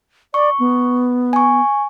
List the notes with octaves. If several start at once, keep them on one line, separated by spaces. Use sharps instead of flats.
D5 C#6
B3
G#5 C#6